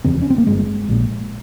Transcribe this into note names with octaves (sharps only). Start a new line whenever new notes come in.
F1 E2 C#3 C4
C#4
C4
A#3
G1 G2 G#3
A#1 A#2